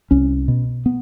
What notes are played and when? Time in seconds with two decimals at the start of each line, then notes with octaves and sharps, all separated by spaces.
0.11 C2 C#4
0.48 B2
0.86 B3